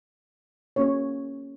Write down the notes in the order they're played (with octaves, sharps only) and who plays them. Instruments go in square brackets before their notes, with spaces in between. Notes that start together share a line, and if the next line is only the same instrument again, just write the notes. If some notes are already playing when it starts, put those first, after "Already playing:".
[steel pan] A#3 C#4 F#4 C#5